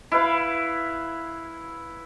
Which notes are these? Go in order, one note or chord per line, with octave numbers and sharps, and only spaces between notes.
E4 B4 F5